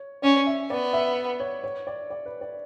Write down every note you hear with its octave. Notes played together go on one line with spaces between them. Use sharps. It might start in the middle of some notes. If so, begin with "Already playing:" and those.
Already playing: C#5
C#4 D5
E5
B3 D5
E5
C#5
C#5
D5
D5
B4
D5